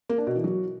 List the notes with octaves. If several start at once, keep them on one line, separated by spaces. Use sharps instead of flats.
A#3
D4
B2
E3
F#3